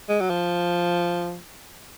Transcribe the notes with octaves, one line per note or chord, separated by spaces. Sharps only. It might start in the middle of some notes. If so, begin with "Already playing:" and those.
G#3
F#3
F3